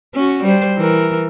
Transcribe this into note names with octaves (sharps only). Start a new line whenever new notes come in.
C#4 F#4
G3 C5
E3 A#4